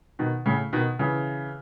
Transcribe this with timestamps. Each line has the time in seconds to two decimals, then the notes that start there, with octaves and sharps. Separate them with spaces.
0.19 B2 D#3
0.46 A2 C#3
0.73 B2 D#3
0.99 C#3 E3